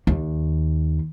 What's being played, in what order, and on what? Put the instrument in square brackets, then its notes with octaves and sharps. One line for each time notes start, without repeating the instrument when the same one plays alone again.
[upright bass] D#2